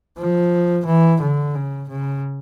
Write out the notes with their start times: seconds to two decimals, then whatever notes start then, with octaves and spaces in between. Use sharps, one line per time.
0.18 F3
0.86 E3
1.21 D3
1.55 C#3
1.89 C#3